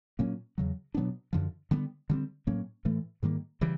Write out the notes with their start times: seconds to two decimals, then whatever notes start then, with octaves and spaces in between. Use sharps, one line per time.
0.19 A#2 F#3 A#3 C#4
0.58 E2 C#3 F#3
0.94 B2 F#3 B3 D4
1.33 F#2 D3 F3
1.71 D3 G3 B3
2.10 D3 G3 C4
2.47 A2 F#3 A#3 C#4
2.85 A2 E3 A3
3.23 G#2 D#3 G3 A#3
3.61 C#3 E3 G3